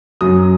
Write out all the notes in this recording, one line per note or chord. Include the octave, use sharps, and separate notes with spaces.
F#2 F#3 D#6